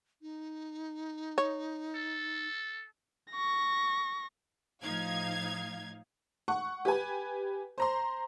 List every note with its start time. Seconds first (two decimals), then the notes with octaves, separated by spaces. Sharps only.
0.22 D#4
1.38 C#5
1.95 A4
3.32 C#6 A#6
4.83 A2 F3 D#4 F5 G#6
6.48 F#5 C#6
6.85 G4 B4 G#5
7.78 C5 A#5 C6